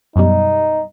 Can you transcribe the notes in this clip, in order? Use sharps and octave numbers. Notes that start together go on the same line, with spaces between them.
F#2 B2 G3 D#4